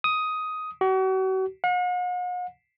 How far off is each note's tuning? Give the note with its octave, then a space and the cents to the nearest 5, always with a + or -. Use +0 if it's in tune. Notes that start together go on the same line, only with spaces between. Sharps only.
D#6 +10
F#4 +40
F#5 -45